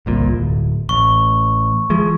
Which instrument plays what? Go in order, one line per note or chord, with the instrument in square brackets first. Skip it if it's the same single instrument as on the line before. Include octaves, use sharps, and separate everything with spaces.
[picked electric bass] G1 C2 A#2
D1
[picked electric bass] A1 [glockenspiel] C#6
[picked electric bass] E3 F3 G#3